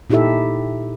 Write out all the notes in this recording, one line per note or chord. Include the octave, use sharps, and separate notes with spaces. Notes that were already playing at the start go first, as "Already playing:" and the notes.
A#2 D#4 E4 G4 A4 E5